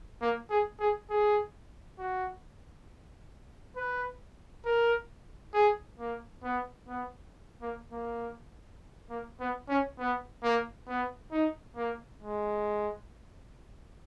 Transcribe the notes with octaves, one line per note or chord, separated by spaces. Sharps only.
A#3
G#4
G#4
G#4
F#4
B4
A#4
G#4
A#3
B3
B3
A#3
A#3
A#3
B3
C#4
B3
A#3
B3
D#4
A#3
G#3